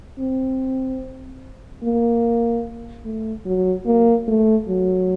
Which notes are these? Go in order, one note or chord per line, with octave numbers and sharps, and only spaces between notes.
C4
A#3
A3
F#3
A#3
A3
F#3